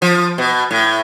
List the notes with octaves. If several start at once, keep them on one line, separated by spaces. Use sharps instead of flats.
F3
B2
A2